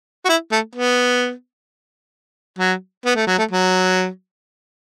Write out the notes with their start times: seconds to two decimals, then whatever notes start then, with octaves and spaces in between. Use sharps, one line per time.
0.25 F#4
0.29 E4
0.52 A3
0.76 B3
2.59 F#3
3.06 B3
3.16 A3
3.27 F#3
3.39 A3
3.51 F#3